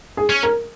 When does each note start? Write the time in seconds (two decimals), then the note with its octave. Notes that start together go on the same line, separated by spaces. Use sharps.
0.17 G#4
0.30 C#4
0.43 A#4